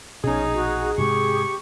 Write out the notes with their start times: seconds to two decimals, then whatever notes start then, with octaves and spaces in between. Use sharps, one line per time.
0.24 A#1 B2 C#4 D#4 G#4
0.54 F#4
0.98 G#2 C3 G#3 G4 C#6